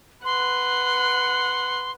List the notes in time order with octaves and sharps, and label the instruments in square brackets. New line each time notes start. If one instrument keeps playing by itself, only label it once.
[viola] B4 F#5 [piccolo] C6